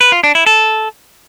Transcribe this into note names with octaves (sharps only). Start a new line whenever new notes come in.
B4
F4
D4
E4
A4